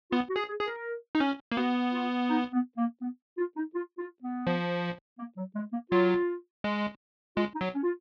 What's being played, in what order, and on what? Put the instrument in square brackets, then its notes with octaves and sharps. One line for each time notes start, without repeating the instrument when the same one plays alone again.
[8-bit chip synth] B3 [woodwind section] F4
[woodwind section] F#4
[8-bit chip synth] G#4
[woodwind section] G#4
[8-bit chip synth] G#4
[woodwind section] A#4
[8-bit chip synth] D#4
C#4
A#3
[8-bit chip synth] B3 [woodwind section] F#4
[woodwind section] F4
D#4
B3
A#3
B3
F4
D#4
F4
F4
B3
[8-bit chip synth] F3
[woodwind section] A#3
F#3
G#3
A#3
[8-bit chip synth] F#3 [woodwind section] F4
[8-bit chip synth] G#3
[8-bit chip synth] G#3 [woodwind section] F4
[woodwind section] D#4
[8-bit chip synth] F#3
[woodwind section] C#4
F4